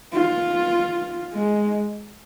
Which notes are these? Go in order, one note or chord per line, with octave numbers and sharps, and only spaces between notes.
F4
G#3